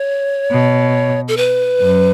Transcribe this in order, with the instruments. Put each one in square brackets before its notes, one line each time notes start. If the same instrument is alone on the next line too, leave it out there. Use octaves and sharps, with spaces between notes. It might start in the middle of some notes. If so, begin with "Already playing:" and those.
Already playing: [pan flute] C#5
[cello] B2
[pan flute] A4
B4
[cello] F#2